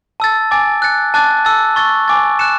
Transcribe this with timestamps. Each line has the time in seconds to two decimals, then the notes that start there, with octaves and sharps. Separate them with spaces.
0.20 A5 E6 A6
0.51 G#5 D6 A6
0.82 F#6 A6 C#7
1.14 A5 D6 F#6 A6
1.45 A5 E6 A6
1.76 C#6 E6 A6
2.08 G#5 D6 A6
2.39 F#6 C#7 E7